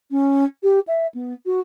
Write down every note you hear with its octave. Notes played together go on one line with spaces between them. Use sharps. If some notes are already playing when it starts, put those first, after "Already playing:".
C#4
G4
E5
B3
F#4